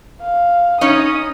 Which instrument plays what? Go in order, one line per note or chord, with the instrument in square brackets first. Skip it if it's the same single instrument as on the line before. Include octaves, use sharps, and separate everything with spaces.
[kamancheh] F5
[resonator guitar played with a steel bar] C#4 D#4 C#5 [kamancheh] D#6